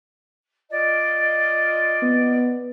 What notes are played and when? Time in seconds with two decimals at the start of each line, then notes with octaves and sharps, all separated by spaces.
0.70 F4 D5 D#5
2.02 B3